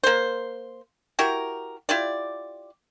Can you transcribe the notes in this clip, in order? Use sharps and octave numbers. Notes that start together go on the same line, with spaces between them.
A#3 C5
E4 F#4 G4 A#4
E4 F4 G4 D5